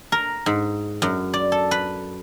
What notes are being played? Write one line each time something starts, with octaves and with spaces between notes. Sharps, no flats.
A#4
G#2
F#2
D5
A4
B4